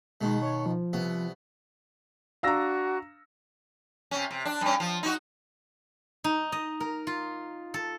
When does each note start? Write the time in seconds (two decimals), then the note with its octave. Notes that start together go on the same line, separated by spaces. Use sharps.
0.21 B2 D#3 G#3
0.42 C#5
0.66 F3
0.93 C2 B3
2.43 D4 F#4 F5 A#5 E6 A#6
4.11 C3 C#4
4.31 C3
4.45 D4
4.61 G2 C#4
4.80 F3
5.03 D#4 F#4
6.24 D#4
6.52 D#5
6.80 A#4
7.07 F4
7.74 A4